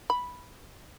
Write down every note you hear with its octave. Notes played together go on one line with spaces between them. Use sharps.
B5